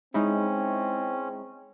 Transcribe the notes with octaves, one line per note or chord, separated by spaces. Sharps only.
G#3 C4 C#4 D#4 E4